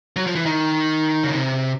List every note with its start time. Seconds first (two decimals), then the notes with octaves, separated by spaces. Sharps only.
0.16 F#3
0.27 F3
0.35 E3
0.46 D#3
1.24 C#3
1.33 C3